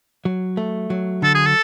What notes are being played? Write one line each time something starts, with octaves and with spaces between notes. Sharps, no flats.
F#3
A3
F#3
D3 A4
G#4
A4